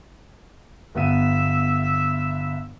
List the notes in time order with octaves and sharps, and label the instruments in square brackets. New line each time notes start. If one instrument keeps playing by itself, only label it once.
[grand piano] G1 B3 D#7 [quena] E5